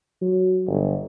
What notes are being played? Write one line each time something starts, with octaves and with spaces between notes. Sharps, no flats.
F#3
G1